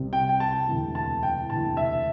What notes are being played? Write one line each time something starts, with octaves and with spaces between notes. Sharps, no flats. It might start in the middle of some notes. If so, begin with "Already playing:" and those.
Already playing: C2 C3 G3 C4
G5
G5
A5
E1 D2 C3 E3
A5
G5
E1 D2 C3 E3 A5
E5